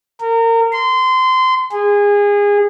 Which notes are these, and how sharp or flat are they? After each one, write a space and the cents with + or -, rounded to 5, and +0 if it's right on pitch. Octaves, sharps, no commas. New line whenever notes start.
A#4 -30
C6 -25
G#4 -25